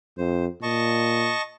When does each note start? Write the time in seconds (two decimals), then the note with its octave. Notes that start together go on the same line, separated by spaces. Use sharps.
0.18 F2 C5
0.63 A#2 D#5 A5 C#6